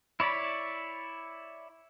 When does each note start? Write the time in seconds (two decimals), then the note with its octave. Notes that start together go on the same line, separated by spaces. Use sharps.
0.20 E4 C#5 D5 B5